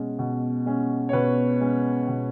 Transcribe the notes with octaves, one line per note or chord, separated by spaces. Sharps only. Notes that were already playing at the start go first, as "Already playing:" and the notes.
Already playing: B2 G#3 C#4
B2
G#3 C#4
C#5
B2 B4
G#3 C#4
B2